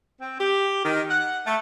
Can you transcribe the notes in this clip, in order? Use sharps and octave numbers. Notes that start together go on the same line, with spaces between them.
C4
G4
D#3
F#5
A3